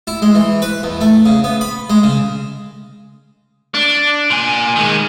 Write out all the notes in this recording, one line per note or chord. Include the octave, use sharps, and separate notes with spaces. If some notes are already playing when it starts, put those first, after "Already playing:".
E4
G#3
E3
B4
E2
A3
C#3
B3
B5
G#3
C#3
D4
A#2 G#5
D#3 G#3